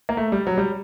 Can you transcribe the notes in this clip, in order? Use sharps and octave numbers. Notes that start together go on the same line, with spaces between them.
A#3
A3
G3
F#3
G3